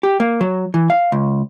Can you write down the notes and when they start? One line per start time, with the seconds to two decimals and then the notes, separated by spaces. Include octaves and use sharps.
0.03 G4
0.20 A#3
0.41 F#3
0.74 E3
0.90 F5
1.12 C#2